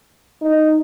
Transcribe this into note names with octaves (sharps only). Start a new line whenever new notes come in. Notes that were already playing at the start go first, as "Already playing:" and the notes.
D#4